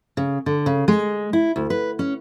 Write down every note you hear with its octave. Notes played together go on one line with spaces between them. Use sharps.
C#3
D3
C#3
G#3
E4
D2
B4
C#4